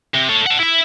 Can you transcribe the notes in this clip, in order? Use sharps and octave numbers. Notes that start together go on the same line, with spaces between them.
C3
A4 C#5
F#5 A5
E4 E5